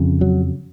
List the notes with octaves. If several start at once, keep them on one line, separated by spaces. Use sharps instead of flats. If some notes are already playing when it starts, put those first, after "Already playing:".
Already playing: F2 C#3
F#3